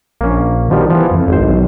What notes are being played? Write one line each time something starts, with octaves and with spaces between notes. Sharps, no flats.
A#1 A#3 C#4
B2 D#3 F3 G3
E3 F3 B3
F2
G#1 F2 C5
B1